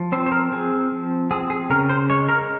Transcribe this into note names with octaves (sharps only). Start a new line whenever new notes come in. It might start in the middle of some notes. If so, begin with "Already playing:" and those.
Already playing: F3
C4 C5
C5
A#4
C4 G#4
F3
C4 G#4
G#4
C#3 A#4
C5
G#3 C#5
A#4